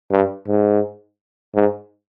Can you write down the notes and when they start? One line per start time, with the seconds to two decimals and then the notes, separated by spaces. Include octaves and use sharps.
0.11 G2
0.47 G#2
1.55 G#2